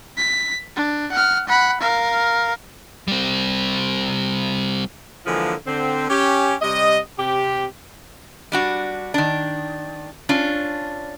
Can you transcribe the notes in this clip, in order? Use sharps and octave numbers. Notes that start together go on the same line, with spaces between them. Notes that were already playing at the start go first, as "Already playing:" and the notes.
B6
D4
F#5 F6
F#5 B5
A#4 F5
G3 C4
D3 E3 F3 G#3 A#3
D3 C4
C#4 G4
C3 G3 D#5
C3 G4
G3 D4 F#4
D#3 D4
C#4 D4 F4